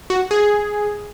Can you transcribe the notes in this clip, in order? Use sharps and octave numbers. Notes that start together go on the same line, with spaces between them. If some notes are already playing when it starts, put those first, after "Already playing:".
F#4
G#4